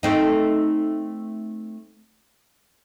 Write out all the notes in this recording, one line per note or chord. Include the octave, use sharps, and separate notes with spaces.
A3 C4 D#4